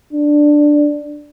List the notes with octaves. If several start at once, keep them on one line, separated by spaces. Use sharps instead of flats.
D4